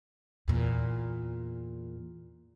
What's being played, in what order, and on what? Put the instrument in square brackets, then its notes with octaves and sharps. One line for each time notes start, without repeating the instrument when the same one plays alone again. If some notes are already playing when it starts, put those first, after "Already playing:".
[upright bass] E2 A#2